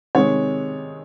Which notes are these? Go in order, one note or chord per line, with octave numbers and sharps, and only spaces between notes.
C3 D#3 G#3 C#5